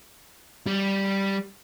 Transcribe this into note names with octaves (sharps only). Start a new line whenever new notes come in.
G3